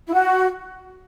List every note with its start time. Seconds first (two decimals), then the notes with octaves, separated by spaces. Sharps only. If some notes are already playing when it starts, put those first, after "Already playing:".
0.07 E4
0.14 F#4